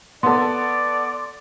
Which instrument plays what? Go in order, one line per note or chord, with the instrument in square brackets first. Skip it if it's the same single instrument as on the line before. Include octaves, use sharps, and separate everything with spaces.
[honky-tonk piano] B3 A4 [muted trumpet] D5 [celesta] C6